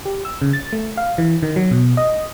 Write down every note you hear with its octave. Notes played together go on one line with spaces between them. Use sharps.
G4
E6
C#3
A6
A3
F5
E3
D#3
F#3
B2
D#5